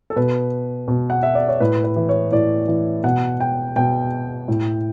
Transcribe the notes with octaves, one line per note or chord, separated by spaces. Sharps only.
A4
B2 B4
B2
F#5
E5
D5
C#5
A2 B4
B4
E3
C#5
A2 D5
E3
B2 F#5
G5
B2 G5
A2